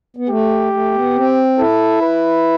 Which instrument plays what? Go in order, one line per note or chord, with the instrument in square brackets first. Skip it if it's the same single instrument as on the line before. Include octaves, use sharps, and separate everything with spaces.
[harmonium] B3
[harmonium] A3 [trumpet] G4
[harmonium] A3
B3
C4
[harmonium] E4 [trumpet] A4
[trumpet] B4